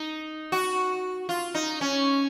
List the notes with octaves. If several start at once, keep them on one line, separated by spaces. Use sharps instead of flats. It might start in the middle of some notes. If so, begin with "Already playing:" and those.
Already playing: D#4
F#4
F4
D#4
C#4